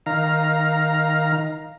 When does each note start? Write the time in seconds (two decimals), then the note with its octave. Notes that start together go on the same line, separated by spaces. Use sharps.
0.06 D#3 F5 A#5